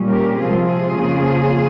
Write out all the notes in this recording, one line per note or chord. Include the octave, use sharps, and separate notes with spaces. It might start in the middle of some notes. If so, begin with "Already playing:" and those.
Already playing: A#2 G3 C#4
G4 A#4
C3 F3 G#3 C4 F4 G#4
F4 G#4
F2 C#3 F3 A#3 C#4